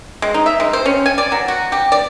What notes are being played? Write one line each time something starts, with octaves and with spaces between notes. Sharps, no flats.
G#3
D#4
E5
G#3
C5
C#4
G#5
D5
F#3
F#4
G4
D5